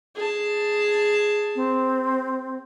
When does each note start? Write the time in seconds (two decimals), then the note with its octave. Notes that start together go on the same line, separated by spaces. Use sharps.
0.15 G#4 A5
1.55 C4